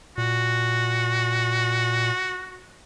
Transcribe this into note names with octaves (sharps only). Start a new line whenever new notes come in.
A#2 F#4